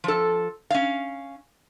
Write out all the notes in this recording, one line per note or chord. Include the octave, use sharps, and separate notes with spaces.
F3 A4
C#4 F5